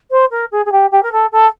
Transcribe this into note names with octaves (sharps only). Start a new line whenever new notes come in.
C5
A#4
G#4
G#4
G4
G4
A#4
A4
A4